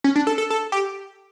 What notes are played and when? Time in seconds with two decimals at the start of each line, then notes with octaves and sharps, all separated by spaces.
0.04 C#4
0.16 D4
0.27 A4
0.38 A4
0.50 A4
0.72 G4